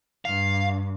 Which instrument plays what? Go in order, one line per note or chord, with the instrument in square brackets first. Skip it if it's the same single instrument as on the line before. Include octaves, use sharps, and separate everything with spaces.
[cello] G2 [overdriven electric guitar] F5